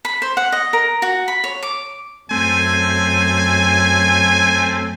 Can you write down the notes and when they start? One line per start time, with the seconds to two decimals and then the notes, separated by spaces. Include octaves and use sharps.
0.05 B5
0.22 C5
0.37 F#5
0.52 D#5
0.73 A#4
1.02 F#4
1.28 B5
1.44 C#5
1.63 D6
2.31 F#2 A3 C4 G#5